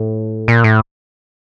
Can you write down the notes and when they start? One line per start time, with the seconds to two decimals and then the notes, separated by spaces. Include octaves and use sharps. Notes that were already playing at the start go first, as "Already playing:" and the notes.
Already playing: A2
0.48 A#2
0.64 A2